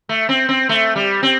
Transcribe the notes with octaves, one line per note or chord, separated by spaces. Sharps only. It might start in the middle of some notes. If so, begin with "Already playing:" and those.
A3
C4
C4
A3
G3
C4